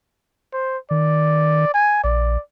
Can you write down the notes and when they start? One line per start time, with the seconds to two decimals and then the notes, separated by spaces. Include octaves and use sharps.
0.53 C5
0.91 D#3 D5
1.74 G#5
2.04 A#1 D5